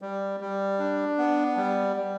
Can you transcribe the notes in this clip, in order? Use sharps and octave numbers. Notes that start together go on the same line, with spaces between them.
G3
G3
D4
B3
G3
G3